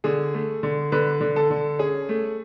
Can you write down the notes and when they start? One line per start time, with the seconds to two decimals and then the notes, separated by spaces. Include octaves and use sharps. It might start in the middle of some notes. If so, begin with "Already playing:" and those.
0.04 D3 G#4
0.34 A3
0.63 D3
0.92 D3 B4
1.21 D3
1.36 A4
1.50 D3
1.79 C#4 G#4
2.09 A3